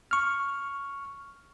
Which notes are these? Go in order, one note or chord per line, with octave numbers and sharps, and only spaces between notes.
C#6 F6